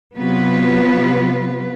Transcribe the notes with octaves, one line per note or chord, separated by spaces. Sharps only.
C3 F#3 B3 F4 B4